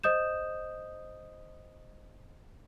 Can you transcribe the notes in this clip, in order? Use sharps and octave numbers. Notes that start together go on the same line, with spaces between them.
C5 D#5 D#6 G6 E7